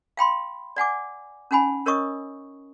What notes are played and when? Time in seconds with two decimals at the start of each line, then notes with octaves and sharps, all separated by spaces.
0.17 F5 G5 B5 C6
0.76 D5 F#5 G#5 D6
1.51 C#4 D#4 F#5 G#5 B5
1.86 C#4 A#4 C#5 D#5 C#6 D#6